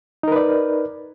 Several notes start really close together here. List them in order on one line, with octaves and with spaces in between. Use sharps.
D#4 A#4 B4 D5